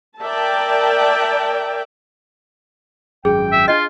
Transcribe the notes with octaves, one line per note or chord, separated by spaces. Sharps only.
A#4 D5 E5 G5 A5
G#1 F#2 G#4 G5
E5
D4 F4 D#5